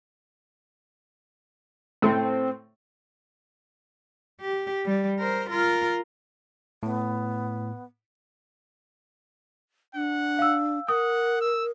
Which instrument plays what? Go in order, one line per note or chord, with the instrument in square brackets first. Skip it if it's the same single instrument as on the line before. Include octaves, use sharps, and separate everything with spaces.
[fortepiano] A2 A3 [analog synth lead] C4
[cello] G4
G3
A#4 C5
F4 A#4
[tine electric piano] A2 [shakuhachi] B3
[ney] D4 [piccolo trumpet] F#5
[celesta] F5 E6
[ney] A#4 [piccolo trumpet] F#5 [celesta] D#6
[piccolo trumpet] E6